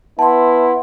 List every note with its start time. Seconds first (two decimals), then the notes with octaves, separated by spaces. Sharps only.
0.19 B3 E4 F#5 A5 C6